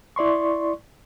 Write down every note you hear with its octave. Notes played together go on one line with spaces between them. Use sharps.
E4 D5 C6 C#6